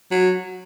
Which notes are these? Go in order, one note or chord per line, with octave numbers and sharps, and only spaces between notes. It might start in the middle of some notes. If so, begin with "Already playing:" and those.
F#3